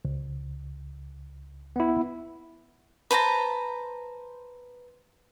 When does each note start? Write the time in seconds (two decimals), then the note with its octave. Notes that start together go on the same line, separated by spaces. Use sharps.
0.05 C#2
1.76 B3 E4
3.11 B4 C5 A5 A#5